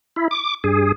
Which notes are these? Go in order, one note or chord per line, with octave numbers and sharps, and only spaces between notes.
E4
D6
G2 G#4